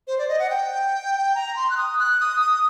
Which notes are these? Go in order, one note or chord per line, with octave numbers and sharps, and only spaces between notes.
C5
D5
D#5
F#5
G5
A#5
C6
F#6
D#6
F#6
D#6
D#6